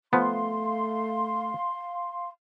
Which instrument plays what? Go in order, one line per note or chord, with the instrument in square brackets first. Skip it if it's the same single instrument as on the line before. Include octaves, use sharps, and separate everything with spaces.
[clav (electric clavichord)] F3 B3 [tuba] A3 [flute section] F5 C6